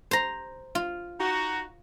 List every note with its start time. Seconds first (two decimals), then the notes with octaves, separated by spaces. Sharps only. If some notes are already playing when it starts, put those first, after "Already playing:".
0.11 C5 A#5
0.75 F4
1.20 D#4 F#4